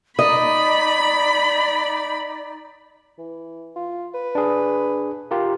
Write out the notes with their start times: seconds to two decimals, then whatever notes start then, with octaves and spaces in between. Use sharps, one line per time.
0.19 D#4 D5 D#5 B5
3.18 E3
3.76 F4
4.14 B4
4.35 D4 G#4
5.31 F4 G4 A#4